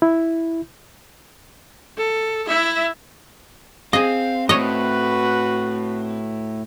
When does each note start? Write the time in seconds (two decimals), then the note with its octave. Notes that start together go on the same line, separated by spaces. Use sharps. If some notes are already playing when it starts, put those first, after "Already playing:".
0.02 E4
1.98 A4
2.47 E4 E5
3.93 C4 G#4 D#5 F5
4.49 A2 F#4 B4 C#5 D#5